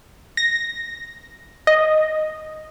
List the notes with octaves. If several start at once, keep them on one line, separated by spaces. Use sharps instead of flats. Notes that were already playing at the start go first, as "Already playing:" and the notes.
A#6
D#5